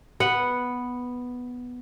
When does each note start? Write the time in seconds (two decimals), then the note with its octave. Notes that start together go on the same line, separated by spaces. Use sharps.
0.20 B3 F#5